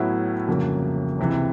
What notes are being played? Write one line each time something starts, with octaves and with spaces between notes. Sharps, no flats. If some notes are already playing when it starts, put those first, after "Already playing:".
Already playing: A2 F#3 B3 E4
G1 F2 C#3 F#3 A#3
C#2 C3 E3